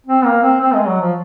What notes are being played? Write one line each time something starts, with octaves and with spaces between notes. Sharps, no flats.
C4
A#3
C4
C4
G#3
F#3
F3